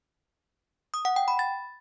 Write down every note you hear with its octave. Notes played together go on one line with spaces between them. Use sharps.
D#6
F#5
G5
B5
A6